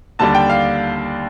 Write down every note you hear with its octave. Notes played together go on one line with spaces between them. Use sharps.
D#2 D3 G3 D4 A5
G5
F5